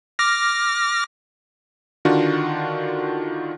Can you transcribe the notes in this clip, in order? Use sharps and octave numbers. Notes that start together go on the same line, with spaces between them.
D6 F6 A#6
D3 D#3 D4 F4 F#4